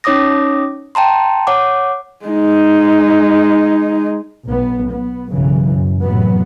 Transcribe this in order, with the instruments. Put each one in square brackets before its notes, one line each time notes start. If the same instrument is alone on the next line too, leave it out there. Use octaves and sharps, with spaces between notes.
[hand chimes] C#4 D#4 C#5 D6 D#6 A#6
G5 A5 A#5 C6
C#5 F#5 D6
[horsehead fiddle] G#3 D#4
[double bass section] B1 B3
B3
B1 G2 C#3 E3 F#3
F#2
F1 A2 E3 F#3 B3